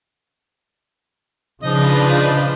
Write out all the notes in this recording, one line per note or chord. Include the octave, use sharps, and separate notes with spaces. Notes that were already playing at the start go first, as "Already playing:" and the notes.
C#3 F3 D4 D#4 F4 B4 D#5